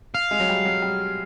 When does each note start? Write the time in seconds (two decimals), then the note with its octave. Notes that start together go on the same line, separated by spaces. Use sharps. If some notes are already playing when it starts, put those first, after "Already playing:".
0.15 F5
0.31 G#3
0.40 F#3
0.49 G3
0.65 F#3
0.82 G3